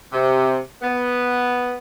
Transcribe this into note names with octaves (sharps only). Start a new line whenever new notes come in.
C3
B3